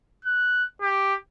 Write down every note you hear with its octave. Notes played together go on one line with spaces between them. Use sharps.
F#6
G4